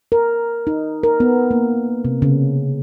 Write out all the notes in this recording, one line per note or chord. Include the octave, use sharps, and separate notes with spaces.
A#4
D#4
A#4
B3
A#3
C3
C#3